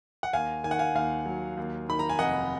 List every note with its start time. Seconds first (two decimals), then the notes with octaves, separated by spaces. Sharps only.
0.23 F#5
0.33 D#2 F5 G#5
0.64 D#3 G#5
0.71 F#5
0.79 F5 G#5
0.95 D#2 F5 G#5
1.26 F#3
1.57 D#2
1.89 D#3 B5
1.99 A#5
2.09 G#5
2.19 F1 D#5 F#5